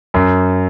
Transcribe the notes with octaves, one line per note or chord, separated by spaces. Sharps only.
F#2